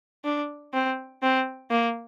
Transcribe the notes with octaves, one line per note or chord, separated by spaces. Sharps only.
D4
C4
C4
A#3